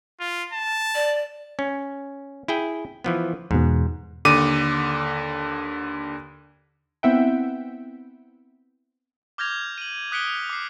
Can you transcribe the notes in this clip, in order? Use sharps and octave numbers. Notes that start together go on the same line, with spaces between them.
F4
A5
D5
C#4
E4 G#4 G5
E3 F3 B3
E2 G#2 B2
D#2 D3 D6 D#7
B3 C4 E4 E5 F#5 G5
D6 F6 G6 G#6 A#6 F7
D#7 F#7
D#6 F#6 B6 C#7 D7 G7
D6 C7